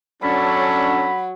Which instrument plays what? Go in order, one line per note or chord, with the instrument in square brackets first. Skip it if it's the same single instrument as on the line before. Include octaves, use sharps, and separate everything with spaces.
[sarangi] F#3 [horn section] C#4 D4 A4 [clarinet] B5